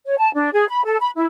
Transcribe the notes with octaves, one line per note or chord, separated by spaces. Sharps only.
C#5
A5
D4
G#4
B5
A4
B5
E4